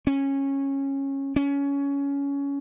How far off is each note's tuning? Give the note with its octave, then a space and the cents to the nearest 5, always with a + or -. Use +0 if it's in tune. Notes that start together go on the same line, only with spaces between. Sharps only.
C#4 -15
C#4 +20